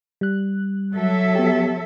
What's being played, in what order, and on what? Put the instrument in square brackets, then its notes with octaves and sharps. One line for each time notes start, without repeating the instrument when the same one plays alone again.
[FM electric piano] G3 F#6
[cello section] F#3 A4 E5
[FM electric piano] B3 G4